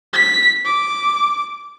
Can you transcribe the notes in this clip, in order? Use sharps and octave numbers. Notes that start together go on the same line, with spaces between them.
B6
D6